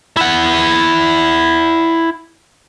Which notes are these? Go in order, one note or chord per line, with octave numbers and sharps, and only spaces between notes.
E4 F#5